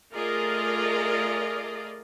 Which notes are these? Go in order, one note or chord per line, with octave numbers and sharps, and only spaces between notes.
A3 F4 G#4 A#4 D5 D#5